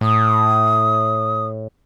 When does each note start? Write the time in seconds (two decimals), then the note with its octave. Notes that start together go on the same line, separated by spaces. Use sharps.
0.01 A2 D#6